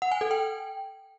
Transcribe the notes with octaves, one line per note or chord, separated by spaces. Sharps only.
F#5
G#5
A4
G5